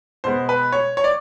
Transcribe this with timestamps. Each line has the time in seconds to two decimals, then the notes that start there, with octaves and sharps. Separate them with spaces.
0.24 B2 G#3 B3 C5
0.49 B4
0.72 C#5
0.97 C#5
1.04 D5